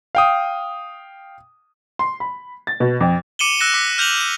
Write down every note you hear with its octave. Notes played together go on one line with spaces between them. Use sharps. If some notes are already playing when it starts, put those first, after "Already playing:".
F5 G5 D#6
C6
B5
A6
B2
F2
D6 C#7 D#7 E7 F#7 G7
E6 F#6 A#6 C#7 E7
D6 B6
F6 G6 F7 F#7
D#7